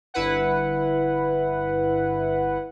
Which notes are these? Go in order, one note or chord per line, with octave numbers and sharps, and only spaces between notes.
G1 E4 B4 F#5